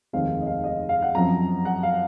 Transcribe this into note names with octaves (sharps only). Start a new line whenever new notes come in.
F1 D#2 D#3 G#3 C4 F5
D#5
F5
D#5
F5
F#5
F#2 F3 C4 A#5
F#5
F5